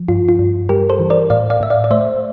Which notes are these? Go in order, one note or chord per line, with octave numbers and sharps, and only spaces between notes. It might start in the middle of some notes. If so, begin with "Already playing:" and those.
Already playing: F3
G2 F4
F4
G2
G3 G4 A#4
A4 C5
E3
A#4 D5
A2 D5 F5
D5 F5
A2 E5
D5 F5
D5
A3 C5 E5